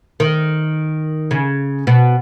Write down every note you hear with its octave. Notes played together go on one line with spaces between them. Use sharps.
D#3
C#3
B2